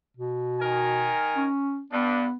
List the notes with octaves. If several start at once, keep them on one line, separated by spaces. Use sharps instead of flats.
B2
D#3 A#4 G#5
C#4
G2 B3 D4